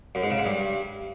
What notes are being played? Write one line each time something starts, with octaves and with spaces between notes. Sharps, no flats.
F#2
G#2
C#3
G#2
G2